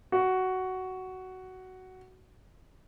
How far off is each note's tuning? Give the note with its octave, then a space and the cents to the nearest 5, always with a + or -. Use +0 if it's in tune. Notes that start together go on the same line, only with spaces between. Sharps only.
F#4 +10